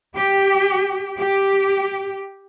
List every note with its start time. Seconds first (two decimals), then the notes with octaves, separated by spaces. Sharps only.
0.16 G4
1.18 G4